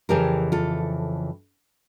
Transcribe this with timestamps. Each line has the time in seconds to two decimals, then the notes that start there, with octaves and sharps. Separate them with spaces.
0.09 F2 C#3 E3 G4 A#4
0.52 F4 A4